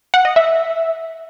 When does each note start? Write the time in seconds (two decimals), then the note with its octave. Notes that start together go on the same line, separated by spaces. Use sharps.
0.14 F#5
0.25 D#5
0.36 E5